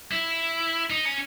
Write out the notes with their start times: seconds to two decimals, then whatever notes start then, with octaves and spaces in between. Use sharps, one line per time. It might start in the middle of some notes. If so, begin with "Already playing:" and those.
0.11 E4
0.90 D#4
1.05 C#4